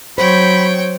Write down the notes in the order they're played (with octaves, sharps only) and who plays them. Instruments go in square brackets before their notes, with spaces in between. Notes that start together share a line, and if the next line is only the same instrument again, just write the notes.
[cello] F#3 [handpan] C5 [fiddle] C#5 G5 [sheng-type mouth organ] B5